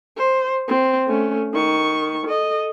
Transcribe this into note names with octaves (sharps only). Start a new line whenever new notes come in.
C5
C4
A3 C#4
D#3 C#6
A4 D#5